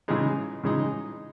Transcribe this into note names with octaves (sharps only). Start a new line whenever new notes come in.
C#3 E3 G#3 D#4
C#3 E3 G#3 D#4